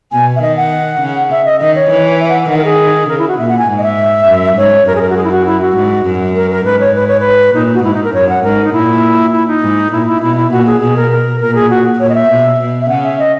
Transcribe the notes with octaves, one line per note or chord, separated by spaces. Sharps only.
B2 G#5
E5
D#3 D#5
F#5
C#3
E5
D#5
D#3 D#5
C#5
E3
E5
F#5
D#3 F#5
A#4
G#4
C#3 A#4
E4
F#4
A#2 E5
F#5
G#5
G#2
D#5
E5
F#2
G#2 C#5
F#2 A#4
G#4
A#4
F#4
G#4
E4
F#4
E4
F#4
G#2
F#2
A#4
A#4
G#2 B4
C#5
B4
C#5
B4
A#2 D#4
F#4
G#2 E4
D#4
A#4
F#2 C#5
F#5
G#2 A#4
D#4
A#2 E4
E4
D#4
G#2
A#2 E4
E4
B2 E4
E4
A#2 F#4
G#4
B2 G#4
A#4
A#4
A#2 A#4
G#4
F#4
A#2 C#5
D#5
E5
B2
B2
E5
C#3 F#5
E5
D#5